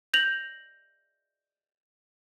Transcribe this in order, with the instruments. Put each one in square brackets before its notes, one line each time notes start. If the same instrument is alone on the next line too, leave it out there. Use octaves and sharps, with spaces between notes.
[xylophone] G6 A#6 F7 F#7